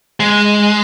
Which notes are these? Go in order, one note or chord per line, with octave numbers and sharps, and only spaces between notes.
G#3